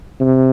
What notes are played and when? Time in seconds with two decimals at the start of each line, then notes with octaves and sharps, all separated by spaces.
0.21 C3